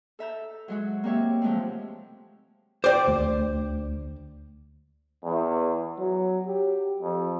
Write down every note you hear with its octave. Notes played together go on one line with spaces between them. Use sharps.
A4 E5 A#5 G6
F#3 G#3 F#4
A#3 C4 G4 C#5 E5
C3 F3 F#3 G#3 A3 C4
C5 D5 G5 D6
D2
E2
F#3
G4
F2